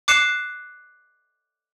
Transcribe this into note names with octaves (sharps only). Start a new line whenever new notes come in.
D6 F#6 C7 C#7 E7